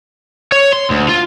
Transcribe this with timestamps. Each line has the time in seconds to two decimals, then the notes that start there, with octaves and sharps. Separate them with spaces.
0.52 C#5
0.73 C6
0.90 D2
1.08 F4